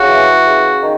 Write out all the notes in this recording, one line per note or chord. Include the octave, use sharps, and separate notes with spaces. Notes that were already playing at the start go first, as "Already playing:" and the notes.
Already playing: C#3 F#4
E3
C#3
D#3